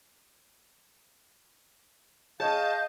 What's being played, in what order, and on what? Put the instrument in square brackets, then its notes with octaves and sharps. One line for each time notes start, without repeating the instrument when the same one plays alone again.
[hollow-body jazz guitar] G#4 C#5 [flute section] D#5 F5 [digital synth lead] A5 [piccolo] G6